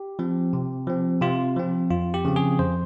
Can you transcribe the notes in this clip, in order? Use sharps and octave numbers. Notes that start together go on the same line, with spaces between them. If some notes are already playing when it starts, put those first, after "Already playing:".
Already playing: G4
F3 C4
C3
F3 C4
C3 F4
F3 C4
F2 F4
G4
C#3 F3 C4
G#4
F2 C5